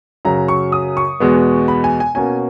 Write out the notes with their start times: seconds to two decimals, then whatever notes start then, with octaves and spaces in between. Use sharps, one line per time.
0.25 F#2 C#3 F#3 A#5
0.48 C#6
0.72 D#6
0.97 C#6
1.20 E2 B2 G#3 B3
1.68 B5
1.84 G#5
2.00 G#5
2.15 B2 A#3 C#4 G#5